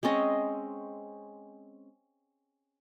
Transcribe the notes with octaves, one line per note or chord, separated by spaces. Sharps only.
G#3 C4 C#4 D#5